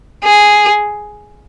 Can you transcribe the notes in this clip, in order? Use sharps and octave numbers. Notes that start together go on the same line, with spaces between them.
G#4